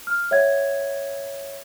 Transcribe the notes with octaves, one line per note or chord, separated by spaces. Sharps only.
F6
C#5 E5 F#5 G#6